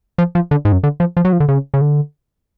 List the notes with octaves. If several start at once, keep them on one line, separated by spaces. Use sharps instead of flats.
F3
F3
D3
G#2
F#2
D3
F3
F3
F#3
F3
D3
C#3
C#3
D3